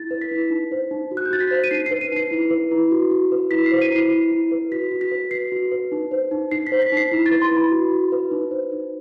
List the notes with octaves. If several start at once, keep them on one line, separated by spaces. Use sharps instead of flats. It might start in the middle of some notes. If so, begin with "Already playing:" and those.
Already playing: E4 A6
B4
B6
E4
D#4
C5
D#4
F#4
F#6
G6
F#4 A6
B6
C5
D#7
D#4 C7
B4 C7
D#7
D#4 C7
E4
B4
E4
F#4
F#4
B4
E4 B6
C7
C5
D#7
E4
C7
E4
E4
B4
F#4 B6
F#4
B6
B4
F#4 C7
F#4
B4
D#4
C5
D#4
D#4 C7
B6
C5
B6
D#4
C7
E4
A6
B4
C6
E4
B5
F#4
F#4
B4
D#4
C5
D#4